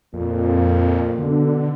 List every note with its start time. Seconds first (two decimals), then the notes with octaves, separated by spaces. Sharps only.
0.14 F2 A#2
1.19 B2 D3